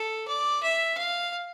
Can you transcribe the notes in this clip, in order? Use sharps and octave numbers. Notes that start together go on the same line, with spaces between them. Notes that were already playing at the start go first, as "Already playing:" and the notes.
Already playing: A4
D5
E5
F5